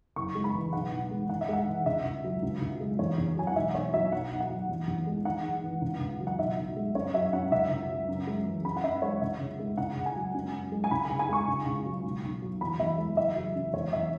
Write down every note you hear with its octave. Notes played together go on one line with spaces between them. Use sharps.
F#1 C#6
G#3
B5
E3
B1 F#5
B1
G#3
G#1 F#5
E5
G#3 F#5
E3
C#2 E5
C#2
F#3
C#2
C#2
G#3
E2 C#5
E2
F#3 G#5
F#5
B1 E5
B1 C#5
F#3 E5
B1 F#5
B1
F#5
F#3
E2
E2
G#3
G#1 F#5
G#1
E3
C#2
C#2
F#3
F#5
B1 E5
B1
G#3
F#2 C#5
F#3 E5
F#2 F#5
C#2 E5
C#2
F#3
F#2
G#3
E3
F#2 B5
F#5
F#2 E5
G#3 C#5
C#2 E5
C#2
G#3
C#2 F#5
C#2
G#5
F#3
F#2
F#2
G#3
G#5
C#2 B5
C#2 G#5
G#5
G#3 C#6
C#2
C#2
F#3
B1
B1
F#3
E2 B5
E2 E5
G#3
F#1 E5
F#3
C#3
E2 C#5
E2 E5